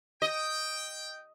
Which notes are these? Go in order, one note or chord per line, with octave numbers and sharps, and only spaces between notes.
D#5 G5